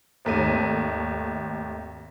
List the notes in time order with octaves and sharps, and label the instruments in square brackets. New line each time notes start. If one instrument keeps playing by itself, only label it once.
[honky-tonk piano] G#1 D#2 A3 D#7